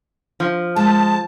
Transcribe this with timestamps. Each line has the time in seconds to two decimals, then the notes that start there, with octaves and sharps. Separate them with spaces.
0.40 F3
0.76 G#3 A5